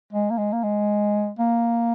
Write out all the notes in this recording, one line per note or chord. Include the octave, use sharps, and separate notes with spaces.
G#3
A#3
G#3
A#3
G#3
A#3